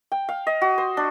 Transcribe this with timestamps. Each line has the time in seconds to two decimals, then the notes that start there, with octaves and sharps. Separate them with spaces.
0.12 G5
0.29 F5
0.47 D#5
0.62 F#4
0.78 C5
0.97 D4